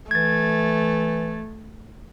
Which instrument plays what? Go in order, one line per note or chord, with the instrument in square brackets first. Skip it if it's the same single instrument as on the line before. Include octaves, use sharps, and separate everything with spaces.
[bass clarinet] E3 [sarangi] A3 [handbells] G#6 A6